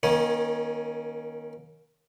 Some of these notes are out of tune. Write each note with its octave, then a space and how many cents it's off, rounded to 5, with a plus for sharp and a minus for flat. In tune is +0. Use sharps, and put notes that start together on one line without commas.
D#3 +0 A#3 +40 C#4 +0